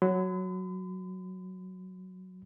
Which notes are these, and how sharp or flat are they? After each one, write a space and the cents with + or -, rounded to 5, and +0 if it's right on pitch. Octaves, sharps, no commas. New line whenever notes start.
F#3 +0 B5 +45